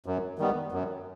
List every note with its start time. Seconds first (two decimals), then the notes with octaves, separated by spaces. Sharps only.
0.06 F#2
0.39 D#3 G3 B3
0.72 F#2